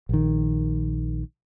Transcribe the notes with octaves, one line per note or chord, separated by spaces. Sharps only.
A#1 D#3